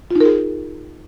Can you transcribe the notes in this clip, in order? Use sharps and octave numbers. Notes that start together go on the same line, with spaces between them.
D#4 F4 G#4 A#4